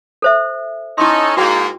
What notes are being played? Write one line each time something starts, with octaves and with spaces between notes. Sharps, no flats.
A4 C5 E5
C#4 D#4 E4 A4 C6
G#2 A#3 F#4 G5